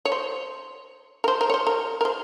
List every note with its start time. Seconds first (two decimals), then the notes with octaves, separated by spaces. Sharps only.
0.05 C#5
0.12 C5
1.24 A#4
1.28 C5
1.41 A#4
1.50 C#5
1.54 C5
1.67 A#4
2.01 A#4
2.05 C5